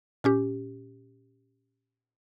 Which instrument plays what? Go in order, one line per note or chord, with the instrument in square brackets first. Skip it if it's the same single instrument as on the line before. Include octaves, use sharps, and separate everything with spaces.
[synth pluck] A#2 C#4 G4